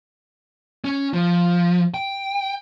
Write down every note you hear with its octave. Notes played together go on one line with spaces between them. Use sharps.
C#4
F3
G5